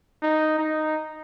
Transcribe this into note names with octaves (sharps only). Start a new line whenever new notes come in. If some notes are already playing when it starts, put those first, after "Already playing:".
D#4
D#4